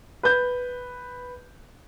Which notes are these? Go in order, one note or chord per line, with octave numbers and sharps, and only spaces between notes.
B4 G6